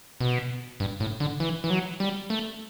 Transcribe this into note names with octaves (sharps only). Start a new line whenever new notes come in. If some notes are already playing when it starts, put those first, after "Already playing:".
B2
G2
A2
D3
E3
E3
F#3
G3
A3